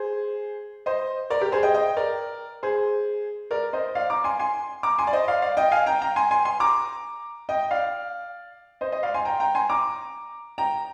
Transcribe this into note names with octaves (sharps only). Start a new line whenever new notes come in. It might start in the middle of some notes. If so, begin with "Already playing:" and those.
Already playing: G#4 C5
C5 D#5
A#4 D5
G4 A#4
G#4 C5
D#5 G5
D#5 G5
A#4 D5
G#4 C5
A#4 D5
C5 D#5
D5 F5
A#5 D6
G#5 C6
G#5 C6
A#5 D6
G#5 C6
D5
C5 D#5
D5 F5
D5 F5
D#5 G5
F5 G#5
G5 A#5
G5 A#5
G#5 C6
G#5 C6
G#5 C6
A#5 D6
D#5 G5
D5 F5
C5 D#5
C5 D#5
D5 F5
G#5 C6
G5 A#5
G5 A#5
G#5 C6
A#5 D6
G5 A#5